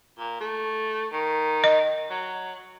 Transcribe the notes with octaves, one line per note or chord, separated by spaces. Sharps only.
A#2
A3
D#3
D#5
F#3